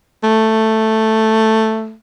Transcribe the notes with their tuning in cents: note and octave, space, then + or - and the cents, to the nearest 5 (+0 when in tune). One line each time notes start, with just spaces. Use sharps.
A3 +5